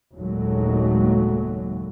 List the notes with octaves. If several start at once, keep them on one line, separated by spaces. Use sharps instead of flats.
F#1 D#2 A#2 F#3 G#3 A3